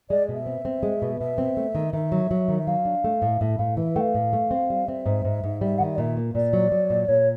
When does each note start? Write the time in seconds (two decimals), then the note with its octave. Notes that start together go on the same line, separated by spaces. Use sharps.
0.10 G#3 D5
0.29 B2
0.34 E5
0.46 C4
0.65 C4
0.83 G#3
1.02 B2
1.20 B2 E5
1.38 C4
1.57 A3
1.75 D#3
1.93 D#3 E5
2.12 F#3
2.31 F#3
2.48 D#3
2.59 E5
2.67 F#3 F5
2.85 D4
3.04 A3
3.22 A2
3.40 A2 E5
3.59 A2 F5
3.77 E3 E5
3.96 A3 G5
4.01 F5
4.15 A2
4.33 A3
4.51 C4
4.70 G3
4.87 C4 E5
5.06 G#2
5.25 G#2
5.44 G#2
5.61 G3 E5
5.78 D#3 E5 F#5
5.95 D5
5.98 A#2 E5
6.17 A#3
6.35 A#2 D5
6.53 F#3
6.72 F#3
6.90 A#2
7.08 A#2 C#5